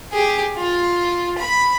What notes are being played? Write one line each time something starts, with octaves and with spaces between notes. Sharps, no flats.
G4 G#4
F4
B5